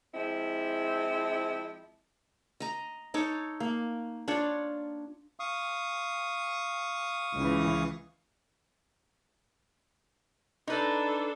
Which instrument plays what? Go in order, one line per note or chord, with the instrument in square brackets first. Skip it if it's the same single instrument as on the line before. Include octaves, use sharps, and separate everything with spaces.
[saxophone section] F3 G#3 C4 E4
[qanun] D#5 A#5
D#4 A4 C#5 D6
A#3
D4 F4 C#5 D5
[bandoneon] F5 C#6 D#6
[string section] C#2 E3
[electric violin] D4 A4 [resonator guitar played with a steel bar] D#4 B4